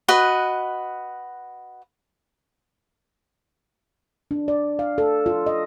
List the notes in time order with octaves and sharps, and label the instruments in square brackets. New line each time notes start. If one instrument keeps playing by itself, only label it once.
[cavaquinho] F#4 B4 D#5
[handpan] D4
D5
F5
A4
F4
D#5